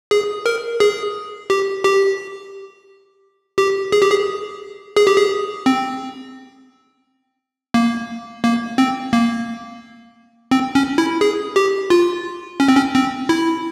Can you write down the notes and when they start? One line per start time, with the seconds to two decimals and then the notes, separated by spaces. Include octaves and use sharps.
0.11 G#4
0.46 A#4
0.80 G#4
1.50 G4
1.84 G4
3.58 G4
3.92 G#4
4.02 G4
4.10 G#4
4.96 G#4
5.07 G4
5.17 G#4
5.66 C4
7.74 A#3
8.44 A#3
8.78 C4
9.13 A#3
10.51 C4
10.75 C#4
10.98 E4
11.21 G#4
11.56 G4
11.90 F4
12.60 C#4
12.68 C4
12.77 C#4
12.95 C4
13.29 E4